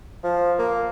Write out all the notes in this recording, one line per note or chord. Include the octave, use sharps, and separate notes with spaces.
F3
A#3